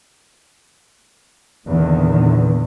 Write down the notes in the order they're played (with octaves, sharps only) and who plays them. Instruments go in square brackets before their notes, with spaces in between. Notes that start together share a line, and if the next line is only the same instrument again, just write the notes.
[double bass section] E2 A#2 D3 D#3